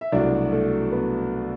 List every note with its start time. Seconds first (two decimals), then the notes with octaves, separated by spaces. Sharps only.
0.01 E5
0.12 C2 B2 F#3 A3 D4 D5
0.52 A3 A4
0.91 B3 B4